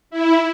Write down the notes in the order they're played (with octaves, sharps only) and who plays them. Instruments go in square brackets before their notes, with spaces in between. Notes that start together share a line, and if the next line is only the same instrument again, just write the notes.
[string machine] E4